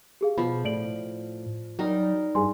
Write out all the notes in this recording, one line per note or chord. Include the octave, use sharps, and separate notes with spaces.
G4 G#4 F5
B2 F3 B5
A2 D5 D7 F#7
F#3 G3 D#4 A#4
G2 G#4 G#5 C6